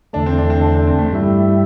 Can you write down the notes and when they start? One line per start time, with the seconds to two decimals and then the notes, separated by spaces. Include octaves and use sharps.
0.13 E2 D3 A3 D4
0.26 C4
0.38 D4
0.50 C4
0.62 D4
0.74 C4
0.87 C4
0.98 A3
1.11 G2 G3 E4